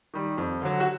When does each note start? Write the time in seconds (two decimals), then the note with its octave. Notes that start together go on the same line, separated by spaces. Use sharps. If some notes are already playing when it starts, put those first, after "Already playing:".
0.14 D#3 G3
0.38 F2
0.62 D3 F#3
0.80 F#4